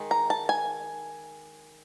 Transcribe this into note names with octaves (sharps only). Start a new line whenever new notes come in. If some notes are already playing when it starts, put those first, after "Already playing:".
Already playing: D#3 G#3
A#5
A5
G#5